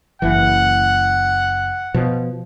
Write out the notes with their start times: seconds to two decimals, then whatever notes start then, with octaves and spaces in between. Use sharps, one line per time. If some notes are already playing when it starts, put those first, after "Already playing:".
0.22 F#1 E3 F#5
1.94 B2 F3